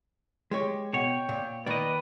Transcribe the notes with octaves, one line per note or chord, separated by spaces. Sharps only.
G#3 G4 C#5
B2 C#5 G5
A#2
D#3 A#3 B4 D5 D#5